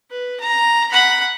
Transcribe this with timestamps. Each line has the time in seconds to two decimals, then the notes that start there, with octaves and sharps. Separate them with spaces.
0.10 B4
0.40 A#5
0.91 F#5 B5